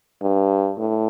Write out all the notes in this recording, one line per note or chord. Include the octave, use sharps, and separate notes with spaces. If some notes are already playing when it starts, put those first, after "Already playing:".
G2
A2